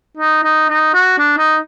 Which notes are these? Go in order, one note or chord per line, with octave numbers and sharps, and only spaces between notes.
D#4
D#4
D#4
F#4
D4
D#4